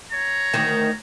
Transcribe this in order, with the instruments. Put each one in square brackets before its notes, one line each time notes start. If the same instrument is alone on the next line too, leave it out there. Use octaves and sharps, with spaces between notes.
[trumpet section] C#5 A#5
[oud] D2 D#3